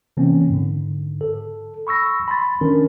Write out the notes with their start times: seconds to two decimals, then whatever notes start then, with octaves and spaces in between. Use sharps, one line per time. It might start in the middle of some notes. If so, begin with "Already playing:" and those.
0.17 C3 E3 A#3 C4 C#4
0.50 G#2 D3
1.21 A4
1.87 B5 C#6 E6 A#6
2.28 B5 C6 A6
2.61 D#3 C#4 D4 A#4